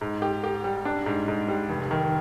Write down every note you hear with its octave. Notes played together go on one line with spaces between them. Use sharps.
G#2
G4
G4
G3
D4
G#2
G#2
G3
F1
D#3